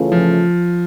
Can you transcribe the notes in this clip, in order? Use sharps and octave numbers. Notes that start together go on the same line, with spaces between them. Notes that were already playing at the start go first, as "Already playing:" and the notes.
Already playing: C#3 E3 A3 C#4 F4
F3